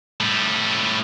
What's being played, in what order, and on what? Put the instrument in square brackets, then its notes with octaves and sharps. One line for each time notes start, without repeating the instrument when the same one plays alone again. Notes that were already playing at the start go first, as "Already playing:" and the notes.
[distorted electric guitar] A2 G3